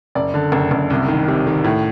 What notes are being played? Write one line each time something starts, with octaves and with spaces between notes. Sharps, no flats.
F#1 D5
D3
F#1
F#1
C2
D#3
C3
D#3
A2